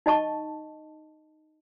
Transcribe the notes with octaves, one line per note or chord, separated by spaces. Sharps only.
D#4 D#5 A5 C#6